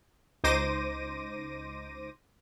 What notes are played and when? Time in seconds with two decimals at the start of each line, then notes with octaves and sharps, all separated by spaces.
0.44 C#2 D#4 C5 D6 A#6 D#7